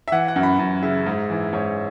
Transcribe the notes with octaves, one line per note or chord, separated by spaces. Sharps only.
E5
E3 F#5
F#5
F#2
B5
F#2
C#3 E5
G#2
E3
G#2 C#5